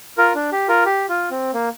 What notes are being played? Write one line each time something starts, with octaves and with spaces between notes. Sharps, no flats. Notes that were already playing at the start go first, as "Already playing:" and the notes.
F4 A#4
D4
G4
F4 A#4
G4
F4
C4
A#3